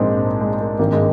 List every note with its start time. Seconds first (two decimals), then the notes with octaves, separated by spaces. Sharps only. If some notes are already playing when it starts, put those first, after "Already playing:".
Already playing: A#1 G#2 F3 G#3 A#3 C4 D4
0.41 G#3
0.61 A#3
0.79 G#1 G2 D#3 A#3
0.92 G#3